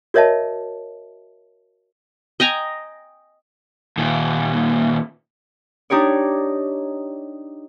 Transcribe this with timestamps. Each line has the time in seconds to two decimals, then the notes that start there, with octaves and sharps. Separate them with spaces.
0.14 F#4 A#4 C#5 D#5 E5 A5
2.40 D#5 G5 G#5 A#5
3.98 D#2 A#2
5.90 D4 D#4 G4 C#5 D5